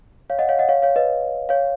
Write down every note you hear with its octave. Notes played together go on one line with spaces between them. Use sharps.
C#5 F5
D#5 F#5
C#5 F5
D#5 F#5
C#5 F5
C#5 F5
B4 D#5
C#5 F5